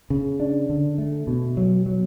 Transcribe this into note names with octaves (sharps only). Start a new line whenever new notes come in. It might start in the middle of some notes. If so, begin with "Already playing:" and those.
C#3
D4
D3
A3
B2
F#3
F#3